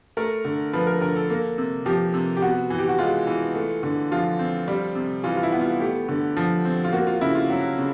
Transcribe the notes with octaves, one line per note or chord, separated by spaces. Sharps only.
A3 A#4
D3
F3 B4
A#4
D3 A#4
A4
A#3
C3
F3 G4
C3
G4
B3 F#4
E3
G4
F#4
G#3 F4
E3
A3
D3
F3 F4
C4
G3
C3
E3 F4
F4
E4
B3
F4
A3 G4
D3
F3
C4
F4
A#3 F#4
F4
C#3 E4
F4
F#3
C#3